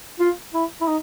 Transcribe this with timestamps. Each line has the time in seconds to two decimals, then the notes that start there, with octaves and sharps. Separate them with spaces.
0.20 F4
0.54 E4
0.81 E4
0.87 D#4